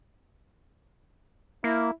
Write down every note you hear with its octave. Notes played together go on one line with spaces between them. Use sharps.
A#3 E4